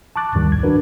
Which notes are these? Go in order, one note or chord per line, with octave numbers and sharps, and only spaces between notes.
A5 C#6 D6 F#6 A6
D#2 G#2 D#3 G3
C2 G#6
F3 D4 F#4 A#4 B4